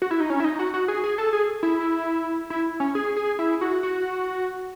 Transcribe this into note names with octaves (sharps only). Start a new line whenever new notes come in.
F#4
E4
D#4
C#4
E4
D#4
F#4
F#4
G#4
G#4
A4
G#4
E4
E4
C#4
G#4
G#4
E4
F#4
F#4